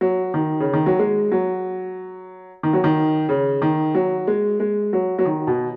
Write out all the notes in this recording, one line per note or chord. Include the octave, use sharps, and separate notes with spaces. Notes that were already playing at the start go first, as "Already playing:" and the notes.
F#3
D#3
C#3
D#3
F#3
G#3
F#3
D#3
F#3
D#3
C#3
D#3
F#3
G#3
G#3
F#3
F#3
D#3
B2